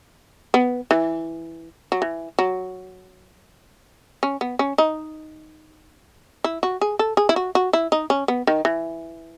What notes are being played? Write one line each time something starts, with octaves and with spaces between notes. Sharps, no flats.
B3
E3
F#3
E3
F#3
C#4
B3
C#4
D#4
E4
F#4
G#4
A4
G#4
E4
F#4
F#4
E4
D#4
C#4
B3
D#3
E3